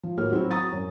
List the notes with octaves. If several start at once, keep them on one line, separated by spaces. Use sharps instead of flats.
F3
A2 A#3 F#4 F6
F#3 C4 E4 F#4
A#5 C#6 D#6 A6
F#2